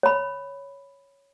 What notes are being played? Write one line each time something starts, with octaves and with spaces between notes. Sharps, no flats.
C#5 B5